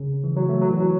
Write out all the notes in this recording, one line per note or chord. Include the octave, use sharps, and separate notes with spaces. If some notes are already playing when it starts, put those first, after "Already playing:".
Already playing: C#3
E3
F#3
A3
F#3
E3
F#3